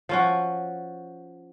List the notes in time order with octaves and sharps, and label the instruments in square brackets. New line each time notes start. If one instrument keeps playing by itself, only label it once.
[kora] F3 C#4 F#4